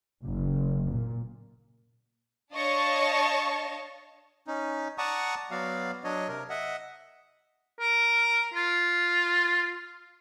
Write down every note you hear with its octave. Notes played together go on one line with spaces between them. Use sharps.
F#1
A#2
D4 C#5 D#5 F5 A5 C#6
C#4 D#4
D5 F#5 A5 A#5 C#6 D#6
F#3 B3 F#4 D5 F5
F#3 D4 C#5 D#5
C3 A#4
D#5 E5 F#5
A#4
F4